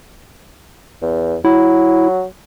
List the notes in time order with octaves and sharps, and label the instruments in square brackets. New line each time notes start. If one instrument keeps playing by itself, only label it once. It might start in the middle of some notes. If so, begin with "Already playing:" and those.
[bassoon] E2
[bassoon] F#3 [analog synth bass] E4